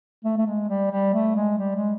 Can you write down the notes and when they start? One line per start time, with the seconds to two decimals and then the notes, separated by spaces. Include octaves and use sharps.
0.24 A3
0.38 A3
0.46 G#3
0.69 G3
0.91 G3
1.13 A3
1.36 G#3
1.58 G3
1.75 G#3